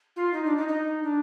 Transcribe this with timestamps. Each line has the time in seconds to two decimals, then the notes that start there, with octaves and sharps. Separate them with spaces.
0.16 F4
0.33 D#4
0.45 D4
0.57 D#4
0.68 D#4
1.03 D4